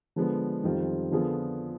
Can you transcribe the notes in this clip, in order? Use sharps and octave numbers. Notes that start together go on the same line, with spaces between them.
D3 F3 G#3 B3
F2 D#3 G3 C4 F4
D3 F3 B3 F4 G#4